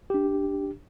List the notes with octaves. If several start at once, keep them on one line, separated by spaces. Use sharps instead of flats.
D4 G4